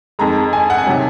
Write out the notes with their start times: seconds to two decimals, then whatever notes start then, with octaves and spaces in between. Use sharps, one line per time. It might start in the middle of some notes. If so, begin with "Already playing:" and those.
0.19 F2 D#3 G#3 A#5
0.53 G#5
0.70 F#5
0.78 G#5
0.87 C3 D#3 F#3